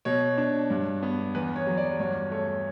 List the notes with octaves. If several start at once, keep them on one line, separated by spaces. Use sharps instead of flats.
B2 C#5
D4
G2
B3
E2 B4
C#5
F#3
D5
G2 C#5
A3 C#5